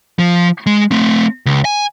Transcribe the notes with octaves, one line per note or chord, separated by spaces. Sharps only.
F3
G#3
A3 C4
C#2
G#5